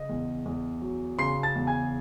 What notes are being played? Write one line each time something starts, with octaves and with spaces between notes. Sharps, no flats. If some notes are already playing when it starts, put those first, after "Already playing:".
Already playing: C#3 D#5
E2
E2
F#3
C#3 C6 C7
A5 A6
E2
G#5 G#6